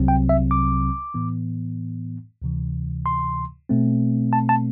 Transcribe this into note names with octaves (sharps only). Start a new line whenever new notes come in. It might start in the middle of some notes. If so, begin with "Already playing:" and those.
Already playing: C2 C3 F#3 C4
G5
E5
D6
A2 E3 B3
D2 C3 E3
C6
B2 A3 C4
A5
A5